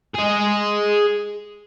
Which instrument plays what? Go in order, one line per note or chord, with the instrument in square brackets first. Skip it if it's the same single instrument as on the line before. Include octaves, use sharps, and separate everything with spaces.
[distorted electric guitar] G#4 D#5